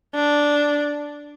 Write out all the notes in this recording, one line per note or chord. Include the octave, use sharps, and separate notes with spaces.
D4